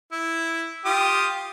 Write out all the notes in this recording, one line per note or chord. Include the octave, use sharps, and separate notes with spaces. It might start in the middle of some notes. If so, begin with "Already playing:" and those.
E4
F4 G4 D#6